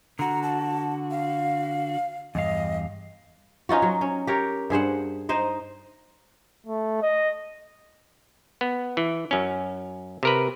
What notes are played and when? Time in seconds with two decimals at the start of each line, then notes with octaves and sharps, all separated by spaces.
0.19 D3 F#4 A#5
0.43 A5
1.11 F5
2.35 E2 G2 D#5 F5
3.69 C#4 D#4 F4 F#4
3.82 F#3
4.01 C#4
4.27 G4 A#4 C#5
4.70 G2 G#4 C5 F#5
5.29 D#4 C5 D#5
6.67 A3
7.02 D#5
8.61 B3
8.97 E3
9.31 F#2 C#4
10.23 C3 A#4 B4